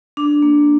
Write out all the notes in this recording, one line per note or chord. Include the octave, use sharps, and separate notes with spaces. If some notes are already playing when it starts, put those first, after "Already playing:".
D4
A#3